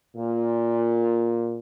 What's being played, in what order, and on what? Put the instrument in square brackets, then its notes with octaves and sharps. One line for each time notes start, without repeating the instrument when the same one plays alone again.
[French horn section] A#2